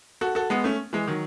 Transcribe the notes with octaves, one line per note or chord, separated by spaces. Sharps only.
F#4 A4
F#4 A4
G#3 B3
A3 C#4
E3 G#3
D#3 F#3